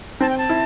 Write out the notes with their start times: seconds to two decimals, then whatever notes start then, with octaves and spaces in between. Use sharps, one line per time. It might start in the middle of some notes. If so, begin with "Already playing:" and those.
0.21 C4 A5
0.29 G5
0.38 A5
0.49 E4